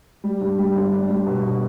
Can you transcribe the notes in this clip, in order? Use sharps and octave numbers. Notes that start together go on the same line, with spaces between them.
G3
G2
G3
G1
D4
G3
B2
B2